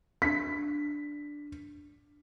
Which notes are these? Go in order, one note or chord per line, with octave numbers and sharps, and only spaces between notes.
D4 B6